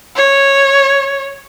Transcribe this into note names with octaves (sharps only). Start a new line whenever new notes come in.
C#5